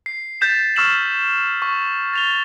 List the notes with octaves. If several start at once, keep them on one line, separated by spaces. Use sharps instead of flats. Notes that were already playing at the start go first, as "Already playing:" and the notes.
C7
G6 A6 B6 E7
C#6 E6 F6 C7 E7 F#7
C#6
A6 F7 G7